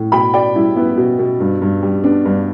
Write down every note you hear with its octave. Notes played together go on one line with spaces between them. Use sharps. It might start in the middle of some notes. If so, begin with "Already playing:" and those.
Already playing: A2
B2 G5 B5
B2 D5 G5
G3 E4
B3 E4
B2
B2
G2
G2
G3
B3 D4
G2